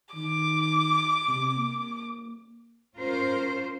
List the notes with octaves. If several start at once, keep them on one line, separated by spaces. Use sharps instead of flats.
D#3 D6
C3
A#3
C#4 F4 A#4 C5